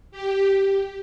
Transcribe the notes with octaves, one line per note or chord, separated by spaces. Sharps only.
G4